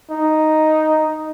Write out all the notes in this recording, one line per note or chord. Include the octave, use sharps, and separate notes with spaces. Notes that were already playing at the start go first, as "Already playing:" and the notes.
D#4